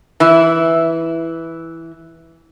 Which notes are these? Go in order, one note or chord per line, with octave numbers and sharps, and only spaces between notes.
E3 E4